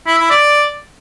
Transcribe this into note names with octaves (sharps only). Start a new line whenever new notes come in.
E4
E4
D5